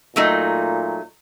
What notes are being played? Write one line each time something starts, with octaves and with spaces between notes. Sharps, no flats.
A#2 F#3 A3 D#4